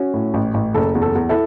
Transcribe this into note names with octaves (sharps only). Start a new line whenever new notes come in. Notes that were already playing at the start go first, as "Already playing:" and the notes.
Already playing: C#4 F#4
A2
A1
A1
F#1 A4
E2
A4
E2
E4 A4